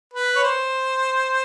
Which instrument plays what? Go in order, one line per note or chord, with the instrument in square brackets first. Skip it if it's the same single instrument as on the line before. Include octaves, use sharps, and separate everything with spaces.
[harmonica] B4
C#5
C5